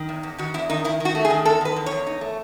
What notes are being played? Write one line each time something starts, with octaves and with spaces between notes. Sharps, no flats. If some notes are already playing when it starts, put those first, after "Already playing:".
Already playing: D#3
E2
E2
D#3 F#4
E2 E4
D#3 D#4
D#3 E4
D#3 F#4
A3
G#4
D#3
E2 A4
D#3 B4
E2
C#5
E2
D#4
A3